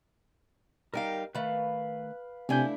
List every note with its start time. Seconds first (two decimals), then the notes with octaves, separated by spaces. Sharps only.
0.94 G3 D#4 A#4 F5 G5
1.35 D#3 A3 B4 F5 B5
2.49 C3 A3 D4 E4 G#5 G6